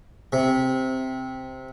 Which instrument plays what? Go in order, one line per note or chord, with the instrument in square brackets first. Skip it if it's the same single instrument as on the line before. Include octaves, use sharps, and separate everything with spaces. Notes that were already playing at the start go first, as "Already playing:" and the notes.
[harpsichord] C3